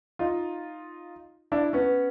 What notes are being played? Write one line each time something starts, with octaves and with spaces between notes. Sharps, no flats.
D#4 F4
D4 E4
B3 C#4